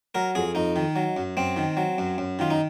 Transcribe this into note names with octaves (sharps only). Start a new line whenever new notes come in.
F#3 A#4
F2 G#4
F2 D#4
D#3
F#3
F#2
F#2 C4
D#3
F#3
F#2
F#2
D#3 F4
D#4